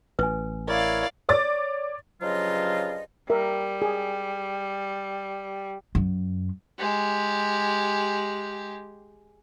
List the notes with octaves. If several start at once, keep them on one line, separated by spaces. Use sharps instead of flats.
A1 B4 G#5
E4 A#4 C#5 D5 F5
C#5 D5 D6 A6
G2 C#3 F3 F#3 F4 D#5
G3 A#4 E5
G#4
F#2
G#3 G4